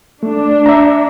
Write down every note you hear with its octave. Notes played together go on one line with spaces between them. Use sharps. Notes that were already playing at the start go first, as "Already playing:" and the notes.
A3 D4
E5 A#5